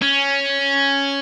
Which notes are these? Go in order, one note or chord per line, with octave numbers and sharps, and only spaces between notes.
C#4